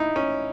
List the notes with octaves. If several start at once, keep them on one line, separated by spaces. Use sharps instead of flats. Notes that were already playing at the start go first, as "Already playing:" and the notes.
Already playing: D#4 E4
C#4